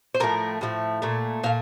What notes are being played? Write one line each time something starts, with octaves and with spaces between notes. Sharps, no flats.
C5
A2 F3 A3 A#4
A2 F3 A3
A#2 A3
A#2 A3 F5